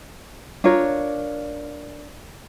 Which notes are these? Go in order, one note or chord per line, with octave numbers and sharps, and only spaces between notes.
D4 F4 A#4 C#5